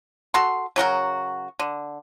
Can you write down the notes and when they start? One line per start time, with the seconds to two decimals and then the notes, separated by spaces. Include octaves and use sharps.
0.34 F#4 A4 C6
0.76 C#3 F#3 F#4 A#4
1.59 D3